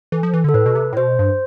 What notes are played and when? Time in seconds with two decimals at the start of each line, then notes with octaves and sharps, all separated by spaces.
0.12 E3 A4
0.23 F3
0.33 E3
0.44 D3 A4
0.54 A2 B4
0.66 B2
0.75 C3
0.93 A2
0.97 B2 C5
1.19 G2